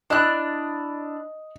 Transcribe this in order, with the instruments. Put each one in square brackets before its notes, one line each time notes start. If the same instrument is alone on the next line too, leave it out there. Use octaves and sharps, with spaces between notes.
[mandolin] D4 E4 F#6 [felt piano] D#5 D#6